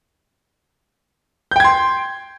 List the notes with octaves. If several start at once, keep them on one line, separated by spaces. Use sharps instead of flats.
G5 C6 G6 G#6